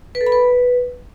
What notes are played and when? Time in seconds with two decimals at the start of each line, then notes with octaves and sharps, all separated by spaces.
0.15 B4
0.21 A4
0.26 B5
0.32 B4